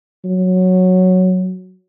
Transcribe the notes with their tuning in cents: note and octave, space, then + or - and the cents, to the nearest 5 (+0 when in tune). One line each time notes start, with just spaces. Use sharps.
F#3 -5